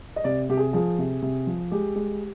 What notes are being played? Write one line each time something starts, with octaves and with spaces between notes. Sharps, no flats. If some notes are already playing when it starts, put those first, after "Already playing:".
D#5
C3 D5
C3 G4
G#4
F3 G#4
C3
C3
F3
G#3 G4
G#3